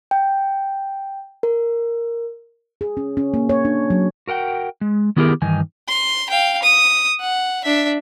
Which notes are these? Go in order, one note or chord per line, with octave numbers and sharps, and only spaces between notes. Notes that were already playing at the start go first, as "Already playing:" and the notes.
G5
A#4
G#4
C#4
C#4
A#3
C#5
D4
F#3
F#4 A#4 F#5 G5
G#3
D#3 B3 E4 G4 G#4 A#4
G2 D#3 E3 D#4 G#5
C6
F5 G5
D#6
F#5
D4 E5